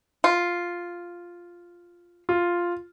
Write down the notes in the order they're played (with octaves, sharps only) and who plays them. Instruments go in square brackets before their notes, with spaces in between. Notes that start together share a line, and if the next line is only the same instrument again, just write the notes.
[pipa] F4
[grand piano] F4